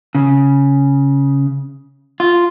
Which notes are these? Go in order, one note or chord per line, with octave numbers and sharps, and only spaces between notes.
C#3
F4